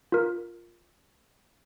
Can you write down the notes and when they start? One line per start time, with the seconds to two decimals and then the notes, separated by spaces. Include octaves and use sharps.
0.12 F4 A#4